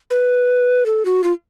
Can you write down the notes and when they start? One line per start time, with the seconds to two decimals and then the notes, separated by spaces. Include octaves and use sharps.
0.11 B4
0.86 A4
1.05 F#4
1.24 F4